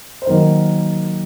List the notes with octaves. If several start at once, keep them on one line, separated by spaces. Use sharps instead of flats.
C5
D#3 F#3 A#3 A#4